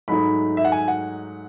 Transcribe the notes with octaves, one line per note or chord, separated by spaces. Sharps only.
G#2 F#3 A3 D#4 B5
E5
F#5
G#5
F#5